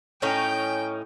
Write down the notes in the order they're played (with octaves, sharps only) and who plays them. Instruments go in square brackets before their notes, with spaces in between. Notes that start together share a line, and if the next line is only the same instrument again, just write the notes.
[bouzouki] A2 C#4 D#4 [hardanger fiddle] G5